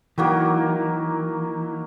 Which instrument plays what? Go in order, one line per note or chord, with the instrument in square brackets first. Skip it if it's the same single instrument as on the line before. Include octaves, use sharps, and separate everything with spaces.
[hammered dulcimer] D#3 F#3 A#3 [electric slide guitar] E3